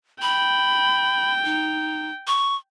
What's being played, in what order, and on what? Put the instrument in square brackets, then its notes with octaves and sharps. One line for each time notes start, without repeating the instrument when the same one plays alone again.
[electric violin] G5 [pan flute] B5
[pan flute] D#4
C#6